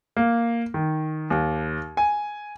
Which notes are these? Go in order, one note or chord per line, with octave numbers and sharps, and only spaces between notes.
A#3
D#3
D#2
G#5